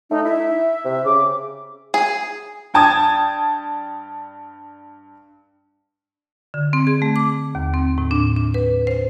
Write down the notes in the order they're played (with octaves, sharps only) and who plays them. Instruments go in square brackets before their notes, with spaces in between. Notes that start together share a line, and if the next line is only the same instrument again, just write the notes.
[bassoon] A3 [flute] D#4
[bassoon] E4 [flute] E5
[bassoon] C3
[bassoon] C#3 [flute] D6
[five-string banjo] G#4
[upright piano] G2 G5 A5 D#6 G#6
[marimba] D3
C4
G#4
A3
D6
D#2
C4
A2
D4
D4
B4
C5